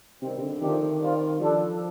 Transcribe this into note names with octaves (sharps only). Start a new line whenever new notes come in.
C3 D#3 G3 C4
C3
D3
C3 D#3 F3 A3 D4 G4
G3 C4 F4
F3 G3 D4 A4